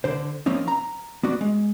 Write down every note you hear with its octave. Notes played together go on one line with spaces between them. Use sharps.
D3 C5
F3 A#3 C4 C#4 D#4
A#5
B3 D4 F#4
G#3